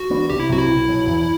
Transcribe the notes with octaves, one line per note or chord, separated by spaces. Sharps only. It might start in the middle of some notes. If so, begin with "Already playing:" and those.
Already playing: F#4
E3 B3 D4
C2 G4
E4
C3 F#3 C4 F#4
E4
B1
B2 F#3
E2